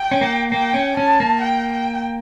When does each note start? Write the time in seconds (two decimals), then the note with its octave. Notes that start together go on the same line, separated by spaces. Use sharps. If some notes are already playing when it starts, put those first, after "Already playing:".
Already playing: G5
0.11 C#4
0.21 A#3
0.52 A#3 G5
0.74 C#4
0.97 C#4 A5
1.20 A#3
1.42 G5
1.73 G5